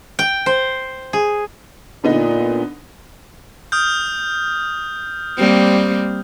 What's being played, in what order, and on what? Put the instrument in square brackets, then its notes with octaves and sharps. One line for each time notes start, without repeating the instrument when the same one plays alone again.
[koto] G5
C5
G#4
[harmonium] A#2 [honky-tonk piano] D3 B3 D#4
[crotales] D#6 F6 G6
[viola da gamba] G3 A#3 C4